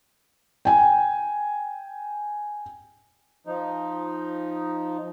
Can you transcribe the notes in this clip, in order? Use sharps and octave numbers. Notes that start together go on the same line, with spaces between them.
G5 G#5
F3 D#4